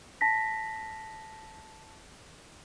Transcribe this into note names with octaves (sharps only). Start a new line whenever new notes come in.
A5 A#6 B6